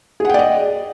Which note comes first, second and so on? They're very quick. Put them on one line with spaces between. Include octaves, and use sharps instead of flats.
G#4 F#5 G5 D5 D#5